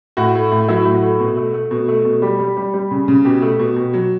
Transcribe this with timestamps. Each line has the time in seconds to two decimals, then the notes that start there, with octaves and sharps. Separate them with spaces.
0.17 A2 F#4
0.35 A3
0.52 A2
0.68 F#3 E4
0.85 A2
0.94 F#4
1.02 A3
1.19 B2
1.37 A3
1.54 A3
1.71 B2
1.88 A3
2.05 B2
2.22 G3 G4
2.40 G3
2.57 G3
2.74 G3
2.91 C#3
3.08 C#3
3.25 B2 G4
3.42 A3
3.59 B2
3.76 B2
3.93 F#3